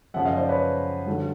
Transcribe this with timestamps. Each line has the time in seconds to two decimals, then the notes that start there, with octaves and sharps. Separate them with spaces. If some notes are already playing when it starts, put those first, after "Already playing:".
0.14 F#2 C#3 F3 E5 F#5
0.25 D#5 F5
0.37 C5 D5
0.49 B4 C#5
1.06 G2 D3 F#3